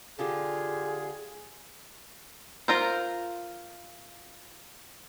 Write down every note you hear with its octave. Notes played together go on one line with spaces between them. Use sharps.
D3 F4 G4 G#4
F4 A#4 C5